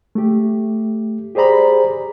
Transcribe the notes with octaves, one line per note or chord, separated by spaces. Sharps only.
A3 G4
G4 G#4 C5 D5 A#5 B5